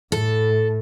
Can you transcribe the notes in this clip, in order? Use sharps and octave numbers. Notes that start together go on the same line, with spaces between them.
A2 A4